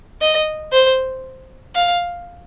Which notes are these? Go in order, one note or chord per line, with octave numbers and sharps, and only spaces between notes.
D#5
C5
F5